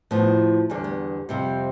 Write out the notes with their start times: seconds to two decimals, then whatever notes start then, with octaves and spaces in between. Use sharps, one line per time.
0.11 A2 F3 B3
0.70 E2 D3 G3
0.84 B3
1.29 F2 C3 G3